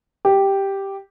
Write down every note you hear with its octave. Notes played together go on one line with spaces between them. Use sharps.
G4